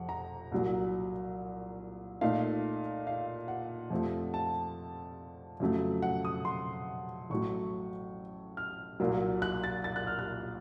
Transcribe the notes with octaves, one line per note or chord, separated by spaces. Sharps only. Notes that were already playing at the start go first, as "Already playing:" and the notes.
Already playing: F1 F2 F#5
A#5
C2 A#2 F#3
A#2 A3 D#4 F5
F5
F#5
F2 C3 F3 A3
A5
F2 C#3 F#3 A3
F#5
D#6
C6
A1 A2 F#3 C#6
F6
C2 A#2 F#3 A#3
F#6
A6
A6
F#6
F6
F#6